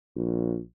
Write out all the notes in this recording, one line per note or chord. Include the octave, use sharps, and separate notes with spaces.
A#1